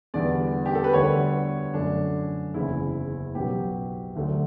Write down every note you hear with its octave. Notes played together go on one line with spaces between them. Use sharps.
E2 D3 G3 B3 D5
G4
A4
B4
D2 D3 G3 B3 C#5
F#2 D3 A3 D4
F#1 E2 C#3 E4
B1 B2 F#3 G4
D2 D3 F#3 A3